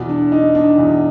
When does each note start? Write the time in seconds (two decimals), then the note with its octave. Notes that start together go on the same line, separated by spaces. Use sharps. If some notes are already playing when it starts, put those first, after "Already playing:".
Already playing: E2 B2
0.09 D4
0.32 D#4
0.55 D4
0.78 E2 B2